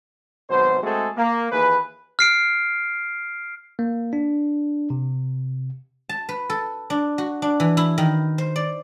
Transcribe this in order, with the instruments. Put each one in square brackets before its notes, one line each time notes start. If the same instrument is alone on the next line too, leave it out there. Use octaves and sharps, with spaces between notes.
[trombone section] G#1 B2 F#3 C5
G#3 A3 C4 F#4 G#4 A4
A#3
D#2 E3 G#4 B4
[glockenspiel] F6 C7 D7
[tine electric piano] A#3
D4
C3
[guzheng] A5
B4
A4
D4
F#4
D4
E3
E4
D#3
C5
D5